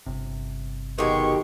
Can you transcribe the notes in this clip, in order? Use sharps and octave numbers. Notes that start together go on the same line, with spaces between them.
G1 C3
B2 D#3 G#3 G4 C#6